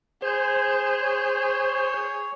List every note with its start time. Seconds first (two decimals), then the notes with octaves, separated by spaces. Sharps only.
0.22 G#4 C5
1.01 C#5